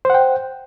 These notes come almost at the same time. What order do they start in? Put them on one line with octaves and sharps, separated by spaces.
C5 F#5 G5